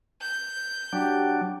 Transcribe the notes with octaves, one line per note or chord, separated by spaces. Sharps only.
G6
F#3 D4 G4